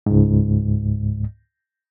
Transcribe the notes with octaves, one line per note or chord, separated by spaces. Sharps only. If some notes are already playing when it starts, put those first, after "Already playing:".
C#2 G#2